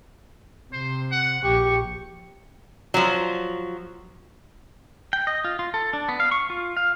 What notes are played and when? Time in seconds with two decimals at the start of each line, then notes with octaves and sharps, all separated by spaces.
0.73 C3 C5
1.12 F#5
1.44 A#1 G4 C#6
2.94 F3 F#3
5.13 G5
5.27 D#5
5.45 F4
5.59 F4
5.74 A4
5.93 D4
6.09 B3
6.20 F5
6.31 C#6
6.50 F4
6.77 F5